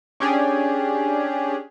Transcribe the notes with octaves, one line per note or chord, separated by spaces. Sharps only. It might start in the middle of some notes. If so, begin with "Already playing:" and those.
C#4 D4 G4 G#4